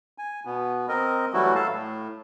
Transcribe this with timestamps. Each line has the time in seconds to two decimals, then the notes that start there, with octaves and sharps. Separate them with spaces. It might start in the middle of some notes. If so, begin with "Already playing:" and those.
0.18 G#5
0.45 B2 B3
0.89 C4 A#4 D#5
1.33 E3 F#3 G3 A3 E4 F#4
1.55 A4 F5 A5
1.69 A2